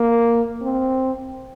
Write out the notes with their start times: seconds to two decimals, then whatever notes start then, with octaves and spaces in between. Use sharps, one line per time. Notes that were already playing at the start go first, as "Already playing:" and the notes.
Already playing: A#3
0.62 C4